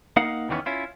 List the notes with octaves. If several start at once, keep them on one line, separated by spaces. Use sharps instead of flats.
A#3 D#4 F5 F#5
E2 D#3 E3 G3 B3 C#4
C#4 E4 F4